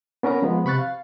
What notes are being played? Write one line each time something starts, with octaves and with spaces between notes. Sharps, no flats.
B3 C#4 A#4 B4 A#5
F3 G#3 B3
C3 B5 C#6 F#6 A6
F5